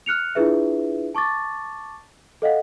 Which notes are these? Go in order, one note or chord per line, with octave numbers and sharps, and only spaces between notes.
F6 F#6 C#7 F7
D4 E4 F4 G#4 B4 E5
A5 C#6 D6 A6
A4 D#5 F5 F#5